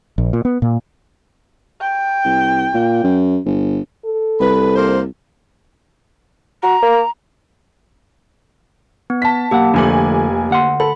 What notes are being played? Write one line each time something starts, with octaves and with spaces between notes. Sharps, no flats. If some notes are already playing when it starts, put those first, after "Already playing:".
A#1
A#2
B3
A#2
G5
C2
A#2
F#2
G1
A4
C2 B4
A#3 C5
F#4 A#5
A#3
B3
A5 B6
B1 A#3 G4 F#5
F1 D3 F3 A3 G#5 F#7
D2 F#5 C6
A4 B5